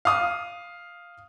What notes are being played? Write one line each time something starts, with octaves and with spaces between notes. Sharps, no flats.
F5 D#6